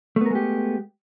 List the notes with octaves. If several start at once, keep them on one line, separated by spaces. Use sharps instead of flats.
G#3 A3 B3 G4 A#4